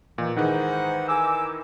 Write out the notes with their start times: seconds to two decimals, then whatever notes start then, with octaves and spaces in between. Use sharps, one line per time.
0.18 A#2 D#3 E3
0.36 G#2 D#3 E3 D#4 F#5
1.09 G#5 D6 E6